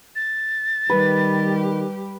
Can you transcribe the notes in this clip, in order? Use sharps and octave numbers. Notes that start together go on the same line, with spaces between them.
A6
D#3 G3 G4 B4